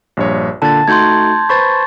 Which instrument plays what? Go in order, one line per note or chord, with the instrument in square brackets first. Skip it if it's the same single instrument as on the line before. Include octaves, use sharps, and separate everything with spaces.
[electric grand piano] A#1 G2 C#5
[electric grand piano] A#2 D3 [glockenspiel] A5 A6
[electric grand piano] A3 D#4 F#4 [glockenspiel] C6 G6 G#6
[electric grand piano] B4 C5 B5 [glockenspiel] C#6 A6